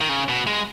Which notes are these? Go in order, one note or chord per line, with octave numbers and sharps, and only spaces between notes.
D#3
C#3
B2
G#3